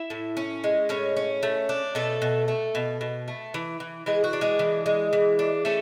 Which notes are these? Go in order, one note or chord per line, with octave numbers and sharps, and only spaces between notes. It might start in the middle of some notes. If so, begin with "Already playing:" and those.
Already playing: E4 E5
A2
C#4
G#3
A2 C#4 C#5
C#4
A3
D4
B2 A3 A4
B2
A3
B2
B2
A3
E3
E3
E3 G#3 G#4
F#4
D4
G#3 G#4
E3
G#3
E3
D4
A3 C#4 A4